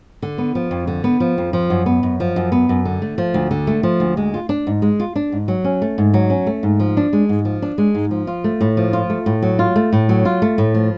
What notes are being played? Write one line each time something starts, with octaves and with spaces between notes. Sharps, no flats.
D3
B3
F3
F2
D3
B3
F3
F2
F3
F#2
B3
F#2
F3
F#2
B3
F#2
D3
A3
F3
D2
D3
A3
F3
D2
G#3
F4
D4
G#2
G#3
F4
D4
G#2
F#3
C#4
A3
G#2
F#3
C#4
A3
G#2
F3
D4
G#3
G#2
F3
D4
G#3
G#2
F3
F4
A3
A2
F3
F4
A3
A2
F#3
F4
A3
A2
F#3
F4
A3
A2
F3